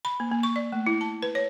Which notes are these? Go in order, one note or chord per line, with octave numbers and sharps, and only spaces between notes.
B5
A#3
A#3
C#6
D5
A3
E4
A5
B4
C#5